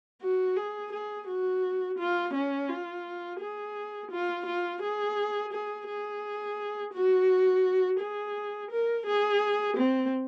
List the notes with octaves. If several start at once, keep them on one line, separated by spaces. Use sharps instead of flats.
F#4
G#4
G#4
F#4
F4
C#4
F4
G#4
F4
F4
G#4
G#4
G#4
F#4
G#4
A#4
G#4
C4